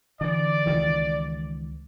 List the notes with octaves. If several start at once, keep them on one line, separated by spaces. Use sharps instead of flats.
D3 E3 D5
C#2 D#3 E3